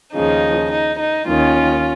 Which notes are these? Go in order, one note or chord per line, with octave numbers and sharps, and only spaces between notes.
D#2 C#3 F3 D#4
D#4
D#4
D#2 D#3 C#4 F4